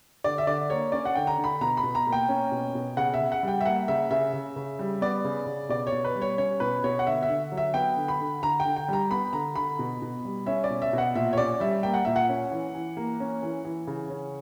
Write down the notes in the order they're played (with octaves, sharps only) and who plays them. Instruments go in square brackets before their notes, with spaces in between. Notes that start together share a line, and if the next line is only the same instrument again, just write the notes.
[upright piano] D3 D5
E5
D3 D5
A#3 C#5
C#4 D5
F#5
D3 G5
A#5
D3
B5
B2 A#5
B5
B2
A#5
A#3
G5
C#4
B2
B2
C#3 F#5
E5
C#3
F#5
G3 G5
E5
A#3 F#5
C#3 E5
C#3 E5
C#3
C#3
G3
B3 D5
C#3
C#3
B2 D5
C#5
B2
B4
G3
C#5
C#4 C#5
B2 B4
B2 C#5
F#5
D3 E5
E5
D3
F#3
E5
B3 G5
D3
B5
D3
D3 A#5
G5
D3
G5
G3 A#5
B3 B5
D3 A#5
D3 B5
B2
B2
G3
C#4 E5
D5
B2
E5
B2
F#5
A#2 E5
C#5
C#4 D5
G3 E5
A#3 G5
F#5
A#2 E5
F#5
C#4
E3
E3
A#3
C#4
E3
E3
C#3
C#4